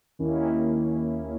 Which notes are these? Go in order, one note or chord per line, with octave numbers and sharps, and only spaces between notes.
D#2 D#3 A#3 C#4 E4